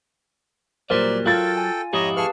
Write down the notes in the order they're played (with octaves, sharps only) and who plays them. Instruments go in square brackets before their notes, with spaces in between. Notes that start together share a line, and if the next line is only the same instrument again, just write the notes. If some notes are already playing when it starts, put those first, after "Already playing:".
[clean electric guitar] A#2 F#3 G3 [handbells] A#4 [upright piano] C5 [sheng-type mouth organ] D5
[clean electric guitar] F#3 [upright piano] F4 A6 [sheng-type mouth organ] A4 G5
[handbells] G#5
[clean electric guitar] F2 G#2 E4 [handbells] G4 D#6 [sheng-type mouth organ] C#5 D#5 A#5
[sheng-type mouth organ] G#4 C#6 F6 [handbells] B4 F5 A5